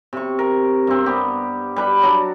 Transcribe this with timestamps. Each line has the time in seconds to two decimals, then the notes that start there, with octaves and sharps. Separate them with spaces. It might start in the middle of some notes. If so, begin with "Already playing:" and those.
0.13 C3 C#6
0.39 A#4
0.87 G2 C4
1.06 B3 G4
1.76 G3 B4 B5
2.02 F#3 D4 A#5